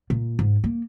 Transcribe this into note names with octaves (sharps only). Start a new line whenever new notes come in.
A#2
G#2
A#3